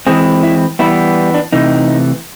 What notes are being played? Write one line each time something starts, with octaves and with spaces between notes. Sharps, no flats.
E3 G#3 C4 G#4
E4
E3 G3 B3 E4
D4
C3 E3 A3 D#4